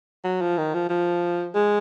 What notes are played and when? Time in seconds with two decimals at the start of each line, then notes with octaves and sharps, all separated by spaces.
0.24 F#3
0.41 F3
0.58 D#3
0.74 F3
0.89 F3
1.54 G#3